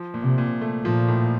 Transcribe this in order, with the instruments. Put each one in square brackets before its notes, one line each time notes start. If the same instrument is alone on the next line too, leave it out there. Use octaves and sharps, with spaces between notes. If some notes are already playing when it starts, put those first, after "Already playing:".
Already playing: [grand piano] F3
A#2
[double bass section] C3
[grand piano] A#2
A3
[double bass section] A#2 [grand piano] F3
[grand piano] A2